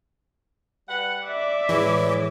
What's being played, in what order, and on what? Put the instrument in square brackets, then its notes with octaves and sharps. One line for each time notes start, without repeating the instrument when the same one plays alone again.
[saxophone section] G3 B4 F#5
[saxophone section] D5 [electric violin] E5 D6
[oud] A2 G#3 [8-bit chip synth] E3